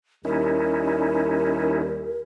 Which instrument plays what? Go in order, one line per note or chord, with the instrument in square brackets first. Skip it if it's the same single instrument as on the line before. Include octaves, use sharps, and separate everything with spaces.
[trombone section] D#2 G3 [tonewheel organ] C#4 D#4 E4 [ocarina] A#4